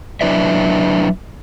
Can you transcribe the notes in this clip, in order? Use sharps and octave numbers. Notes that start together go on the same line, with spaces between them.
F#3 D4 E4 B4 D5 E5